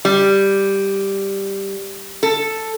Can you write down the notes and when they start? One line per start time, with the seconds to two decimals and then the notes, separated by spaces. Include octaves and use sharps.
0.05 G3
2.23 A4